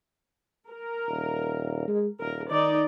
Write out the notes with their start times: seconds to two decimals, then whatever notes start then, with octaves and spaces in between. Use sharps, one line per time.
0.68 A#4
1.08 D#1
1.88 G#3
2.20 D#1 A#4
2.50 D#3 D#4 D5